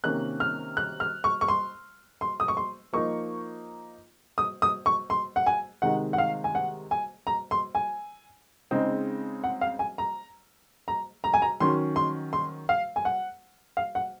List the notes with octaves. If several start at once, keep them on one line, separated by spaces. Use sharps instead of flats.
C3 D#3 A#3 C#4 F#6
F6
F#6
F6
C#6
C#6
C6
C6
D#6
C#6
C6
F3 A#3 D#4 C#6
D#6
D#6
C#6
C6
F#5
G#5
C3 D#3 G#3 D#4 F#5
F#5
F5
G#5
F#5
G#5
A#5
C6
G#5
C#3 G#3 C4 D#4
F#5
F5
G#5
A#5
A#5
A#5
G#5
A#5
D#3 F#3 C#4 C6
C6
C6
F5
G#5
F#5
F5
F#5